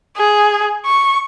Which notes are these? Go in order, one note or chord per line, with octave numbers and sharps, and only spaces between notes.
G#4
C#6